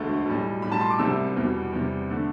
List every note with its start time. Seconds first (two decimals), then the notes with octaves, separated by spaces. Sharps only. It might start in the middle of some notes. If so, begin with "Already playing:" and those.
Already playing: E1 D2 D3 A3
0.26 B1 A2 G3
0.62 B1 A2 G3 B5
0.72 A5
0.81 C6
0.90 D6
0.99 C2 C3 G3 E6
1.36 E2 B2 G3
1.73 E2 C3 G3
2.10 D3 A3